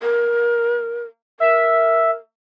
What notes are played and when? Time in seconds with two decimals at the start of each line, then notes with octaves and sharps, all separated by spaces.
0.03 A#4
1.40 A#4 E5